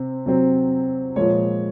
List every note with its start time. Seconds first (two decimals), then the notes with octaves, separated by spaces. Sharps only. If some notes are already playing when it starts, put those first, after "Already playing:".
Already playing: C3 C4
0.26 C3 F#3 C4
1.16 A#2 F3 G#3 C#5